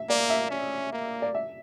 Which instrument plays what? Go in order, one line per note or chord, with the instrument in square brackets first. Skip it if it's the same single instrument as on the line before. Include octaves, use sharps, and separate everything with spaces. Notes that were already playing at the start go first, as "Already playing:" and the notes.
Already playing: [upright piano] E5
[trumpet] A#3 [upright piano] D5
[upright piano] E5
[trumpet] C#4
A#3
[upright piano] D5
E5